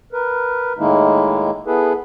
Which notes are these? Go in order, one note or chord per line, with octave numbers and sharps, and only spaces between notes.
A#4 B4
A2 D#3 G#3 A#3 D#4 E4
B3 E4 G#4 A4 B4